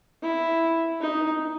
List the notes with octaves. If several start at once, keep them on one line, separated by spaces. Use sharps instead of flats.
E4
D#4